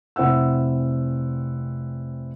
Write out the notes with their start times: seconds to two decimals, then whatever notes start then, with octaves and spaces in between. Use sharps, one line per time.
0.16 F1 C4 E4 F#5 E6